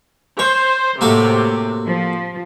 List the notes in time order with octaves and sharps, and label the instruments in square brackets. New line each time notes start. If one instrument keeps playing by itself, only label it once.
[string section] C5 [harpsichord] C#5
[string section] A2 C3 [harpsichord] A#3 F#4 A4
[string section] F3